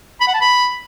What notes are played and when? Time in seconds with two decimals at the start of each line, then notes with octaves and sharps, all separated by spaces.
0.21 B5
0.27 F#5
0.34 A5
0.41 B5